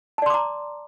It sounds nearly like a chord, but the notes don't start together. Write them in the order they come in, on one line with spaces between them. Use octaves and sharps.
A5 D5 C6 D6 A#5